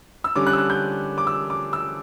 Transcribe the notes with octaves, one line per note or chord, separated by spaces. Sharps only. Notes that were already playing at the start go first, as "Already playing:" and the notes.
E6
D3 G3 C#4 D6
F#6
E6
F#6
G6
D6
E6
D6
E6